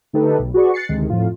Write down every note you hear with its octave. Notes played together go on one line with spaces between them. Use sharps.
D3 A3 D#4 G4 A4 B4
B1
F#4 G#4 B4 D5 C#6
F#6 A6 C7 C#7
D2 C3 D#3 G#3
F2 A2 F4